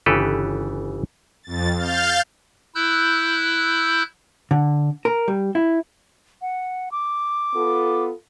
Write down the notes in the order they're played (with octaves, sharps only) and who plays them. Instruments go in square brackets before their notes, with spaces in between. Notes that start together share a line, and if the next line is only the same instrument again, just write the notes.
[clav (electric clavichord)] G1 C#3 E3 G4 A4 B4
[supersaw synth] F2 A6
F5 F6 G6 A6
[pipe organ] E4 E6 F#6 G6
[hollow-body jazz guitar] D3
A#4
G3
E4
[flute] F#5
D6
[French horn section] B3 F4 A4